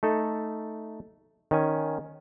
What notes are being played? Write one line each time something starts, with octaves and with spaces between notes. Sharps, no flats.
A3 D#4 A4
D#3 C#4 G#5